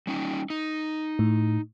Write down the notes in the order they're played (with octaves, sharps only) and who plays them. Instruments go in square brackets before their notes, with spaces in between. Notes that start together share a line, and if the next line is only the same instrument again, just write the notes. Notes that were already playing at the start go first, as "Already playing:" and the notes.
[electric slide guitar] G3 C#4 D#4
D#4
[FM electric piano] A2